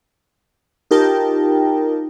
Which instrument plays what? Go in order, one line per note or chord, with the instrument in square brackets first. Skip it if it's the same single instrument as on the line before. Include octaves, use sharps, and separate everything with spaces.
[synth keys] D#4 F4 G4 A#4 G5 A5